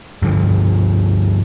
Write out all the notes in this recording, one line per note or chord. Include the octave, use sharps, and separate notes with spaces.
G2 D3 F3